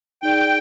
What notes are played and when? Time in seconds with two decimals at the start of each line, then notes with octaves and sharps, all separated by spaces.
0.22 D#4 G#4 D5 G5